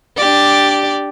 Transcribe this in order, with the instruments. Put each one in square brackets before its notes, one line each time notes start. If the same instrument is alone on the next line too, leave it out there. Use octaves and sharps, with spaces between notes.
[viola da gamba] D4 G4 D5